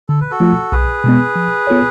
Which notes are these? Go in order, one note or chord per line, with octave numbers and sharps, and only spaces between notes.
D3 A4
B4
F#4 A4
F3 A3 F4
B1 G#4 B4
B2 G#3 B3
F3
B3 F4 A4 C#5